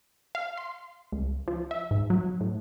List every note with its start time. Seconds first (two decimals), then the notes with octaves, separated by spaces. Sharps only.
0.35 F5
0.57 C6
1.12 C#2
1.48 F3
1.71 E5
1.91 G#2
2.10 F#3
2.40 A2